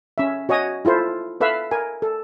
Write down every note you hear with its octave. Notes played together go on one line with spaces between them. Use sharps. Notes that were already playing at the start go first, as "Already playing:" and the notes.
C#4 E5
F#4 C#5 D#5 G#5 D#6
E4 F4 A4 C5
A4 B4 E5 F5
A#4 G#5
A4